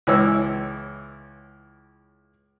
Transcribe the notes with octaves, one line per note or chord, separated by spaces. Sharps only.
C#2 E3 C#5 E6